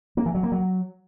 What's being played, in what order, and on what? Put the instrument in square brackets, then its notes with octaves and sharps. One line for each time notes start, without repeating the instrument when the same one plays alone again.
[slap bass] A#3
E3
F#3
A#3
F#3